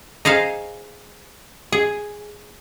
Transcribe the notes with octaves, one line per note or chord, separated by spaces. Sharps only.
D#4 G#4 C5 F5
G#4